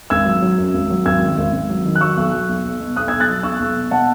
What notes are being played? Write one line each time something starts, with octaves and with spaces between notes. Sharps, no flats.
G#1 E6 G#6
F#3
F#3
F#2
G#1
F#3
G#1 E6 G#6
D#3
G#1
G#1
F#3
D#3
F#6
F#3 C#6 E6
B1
F#3
B1
B1
B2
B1 D#6 F#6
B1 E6 G#6
F#6 A6
F#3
B1 C#6 E6
B1
B2
B2 F#5 A5